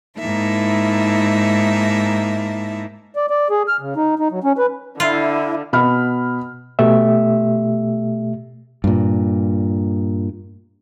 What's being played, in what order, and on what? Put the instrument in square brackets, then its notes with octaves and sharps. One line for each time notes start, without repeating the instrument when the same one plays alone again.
[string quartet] G#2 A#3 D#4 E4 E5 A5
[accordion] D5
D5
G#4
F6
C#3
D#4
D#4
F#3
C#4
B4
[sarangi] D3 [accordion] E4 [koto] F4
[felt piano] B2 B5 F6
[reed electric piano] B2 A3 G4 E5
[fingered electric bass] G2 A#2